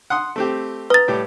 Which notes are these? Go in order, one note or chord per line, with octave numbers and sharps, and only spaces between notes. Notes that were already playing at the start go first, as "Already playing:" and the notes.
F#5 C6 D#6
A3 C4 G4
B4 A#5 D#6 A6
A2 G3 G4